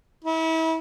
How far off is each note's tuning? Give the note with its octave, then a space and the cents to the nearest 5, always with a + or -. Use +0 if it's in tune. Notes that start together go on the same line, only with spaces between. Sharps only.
E4 -35